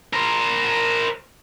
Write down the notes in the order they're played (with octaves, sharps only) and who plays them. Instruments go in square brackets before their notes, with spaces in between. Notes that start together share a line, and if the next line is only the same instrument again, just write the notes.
[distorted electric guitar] A#4 C5